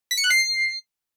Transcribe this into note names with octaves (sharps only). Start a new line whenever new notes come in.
B6
C#7
F#6
C7